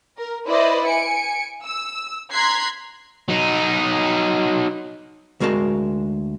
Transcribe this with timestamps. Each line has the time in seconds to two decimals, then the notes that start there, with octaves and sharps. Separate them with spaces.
0.18 A#4
0.47 E4 B4 C5 D5 D#5
0.87 G#5 C#7 D7
1.64 E6
2.31 A#5 C6 F#6 G#6 B6 C7
3.29 F#3 D#4
5.40 D2 G#3 F#4 A#4 A5